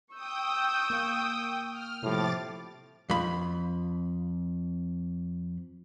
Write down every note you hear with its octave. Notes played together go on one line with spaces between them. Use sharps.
G5 C#6 D#6 E6 G6
A#3 F5
F6
A2 C3 F3 G4 D6 A6
F2 B5